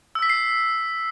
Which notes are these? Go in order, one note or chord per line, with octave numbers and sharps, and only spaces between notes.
E6
B6
C7